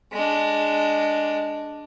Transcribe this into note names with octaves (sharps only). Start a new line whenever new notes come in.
G#3 D4